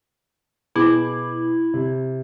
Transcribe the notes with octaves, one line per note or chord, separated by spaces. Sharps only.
B2 E4 G#4 D6
C3